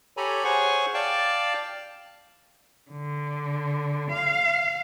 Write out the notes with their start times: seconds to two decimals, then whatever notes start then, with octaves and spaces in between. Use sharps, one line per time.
0.17 G4 A4 C#5 G#5 A#5 B5
0.44 G#4 C5 C#5 F#5 G#5 C#6
0.94 D5 F5 G5 A5
2.91 D3
4.11 F5